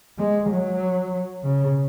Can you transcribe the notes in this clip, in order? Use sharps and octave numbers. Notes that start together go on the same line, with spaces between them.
G#3
F#3
C#3